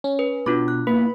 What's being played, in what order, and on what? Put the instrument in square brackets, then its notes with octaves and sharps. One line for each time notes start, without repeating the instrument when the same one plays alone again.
[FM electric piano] C#4
[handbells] B4
[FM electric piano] B2 [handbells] D4 F4 D6 [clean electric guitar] B5
[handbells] F#6
[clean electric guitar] A#3 B3 E4 [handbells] B4 [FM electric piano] B5